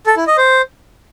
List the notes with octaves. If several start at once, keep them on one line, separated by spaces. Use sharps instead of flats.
A4
E4
D#5
C5